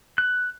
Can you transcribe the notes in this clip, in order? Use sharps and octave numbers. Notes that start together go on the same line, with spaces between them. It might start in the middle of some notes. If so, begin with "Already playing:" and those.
F#6